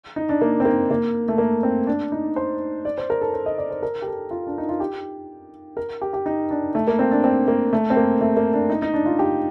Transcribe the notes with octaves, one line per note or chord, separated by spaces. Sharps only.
D#4
D4
A#3
C4
A#3
A#3
A3
A#3
C4
D4
D#4
C5
D5
C5
A#4
A4
C5
D#5
D5
C5
A#4
G4
A4
F4
D4
D#4
F4
G4
A#4
G4
G4
D#4
D4
A3
A#3
C4
D4
C4
A#3
A3
C4
A#3
A3
A#3
D4
D#4
D#4
D4
F4
G4